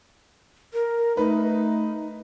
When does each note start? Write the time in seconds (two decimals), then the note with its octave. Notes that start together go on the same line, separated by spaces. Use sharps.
0.73 A#4
1.17 A3 D#4 B4